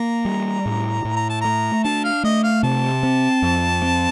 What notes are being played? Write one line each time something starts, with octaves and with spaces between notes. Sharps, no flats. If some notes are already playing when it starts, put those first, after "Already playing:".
Already playing: A#3 A#5
G3
A2
A2
A#5
A5
A3 A#5
D4 A5
F5
A3 D#5
F5
C3 A5
C4
F2
C4